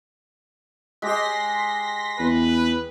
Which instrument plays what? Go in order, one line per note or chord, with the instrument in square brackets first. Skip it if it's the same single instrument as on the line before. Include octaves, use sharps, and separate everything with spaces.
[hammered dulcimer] G#3 G4 [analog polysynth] C6 A#6 B6
[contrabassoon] E2 [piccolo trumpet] B4